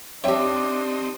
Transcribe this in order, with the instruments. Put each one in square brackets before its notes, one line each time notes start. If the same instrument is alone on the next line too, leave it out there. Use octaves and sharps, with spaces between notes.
[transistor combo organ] C4 D#4 [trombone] D4 [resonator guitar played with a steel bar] G4 E5 [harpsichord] C#5 G5